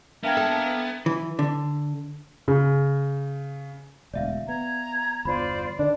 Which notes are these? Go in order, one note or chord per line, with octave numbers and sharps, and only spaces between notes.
A#3 B3 D4 A#4 E5 G5 G#6
A4
E3
D3
C#3
E1 D2 D5 E5 F5
B3 A#5 G#6
G1 E2 F4 C5 D5 B5
D3 D#3 D4